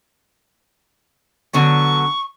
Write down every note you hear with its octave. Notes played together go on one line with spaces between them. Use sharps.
D3 F#3 B3 C#6